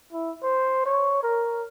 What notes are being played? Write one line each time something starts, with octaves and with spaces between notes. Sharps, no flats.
E4
C5
C#5
A#4